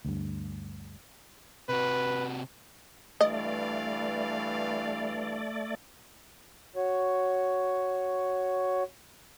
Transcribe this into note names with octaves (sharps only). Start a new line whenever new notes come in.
D2 G2
C3 F#4 B4
G2 E3 A3 D5 D#5 F5
F#4 C#5